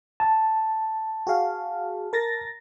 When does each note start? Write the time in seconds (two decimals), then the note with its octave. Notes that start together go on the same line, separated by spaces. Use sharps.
0.20 A5
1.27 F#4 G#4 F5
2.13 A#4 A6 A#6